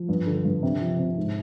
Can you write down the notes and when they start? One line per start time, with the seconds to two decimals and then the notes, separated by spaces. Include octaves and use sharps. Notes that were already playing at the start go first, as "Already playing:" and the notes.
Already playing: F3
0.09 G2
0.27 D3
0.45 G2
0.63 C3
0.81 F3
0.99 C3
1.17 G#2